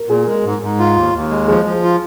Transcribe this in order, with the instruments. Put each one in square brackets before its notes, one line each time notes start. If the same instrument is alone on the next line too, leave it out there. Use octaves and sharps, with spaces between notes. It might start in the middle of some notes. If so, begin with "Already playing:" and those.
Already playing: [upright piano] A#4
[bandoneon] A#2 [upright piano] G#4
[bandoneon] G#3 [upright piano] A#4
[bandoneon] G#2
G#2
F4
D#2
D#2
G#3
[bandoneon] F3 [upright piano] G#4
[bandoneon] F3
F4